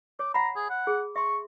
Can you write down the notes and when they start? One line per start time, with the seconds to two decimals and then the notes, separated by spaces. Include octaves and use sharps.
0.19 C#5 D6
0.34 F#5 A#5 B5
0.56 G#4
0.70 F#5
0.87 G#4
1.16 E5 C6 C#6